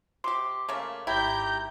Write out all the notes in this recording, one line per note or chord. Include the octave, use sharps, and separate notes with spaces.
C3 G4 C6 D6
C#3 A3 A#3
G#1 E4 G4 G5 A#5 G6